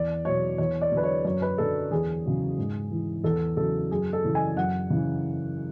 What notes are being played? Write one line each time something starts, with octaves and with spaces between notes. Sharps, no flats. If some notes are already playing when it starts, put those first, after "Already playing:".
Already playing: E2 D5
B2 F#3 C#5
E2 C#5
D5
D3 F#3
B4
C#5
F#2 C#5
B4
D3 F#3 A4
E2 G#4
C#3 F#3
G#2
E3
E2 A4
C#3 F#3 A4
F#2 G#4
A4
C#3 E3
G#5
F#2 F#5
C#3 E3